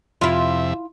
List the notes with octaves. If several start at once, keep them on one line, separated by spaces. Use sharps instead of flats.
F2 C3 E4 F4 E5